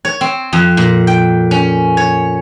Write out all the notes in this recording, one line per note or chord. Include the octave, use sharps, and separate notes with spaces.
C#5
C4
F2
A#2
G5
C#4
C#5